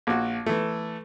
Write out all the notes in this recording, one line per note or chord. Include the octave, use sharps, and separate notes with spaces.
A#1 F#4
E3 A3